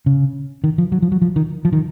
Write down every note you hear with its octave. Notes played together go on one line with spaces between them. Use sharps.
C#3
D#3
F3
F#3
F3
F#3
F3
D#3
F3
D#3